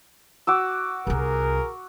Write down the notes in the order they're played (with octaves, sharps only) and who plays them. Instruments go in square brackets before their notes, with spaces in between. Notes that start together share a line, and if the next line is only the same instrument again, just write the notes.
[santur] F#4 D6 E6
[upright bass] C2 C3 [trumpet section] G#4 A#4